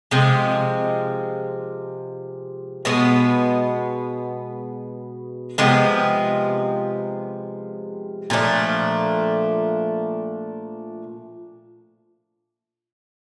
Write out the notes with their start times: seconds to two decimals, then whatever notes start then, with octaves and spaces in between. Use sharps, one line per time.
0.11 C3 F3 G#3
2.85 B2 G#3 B3
5.58 C3 F3 G#3 B3
8.30 A#2 F3 A3 D4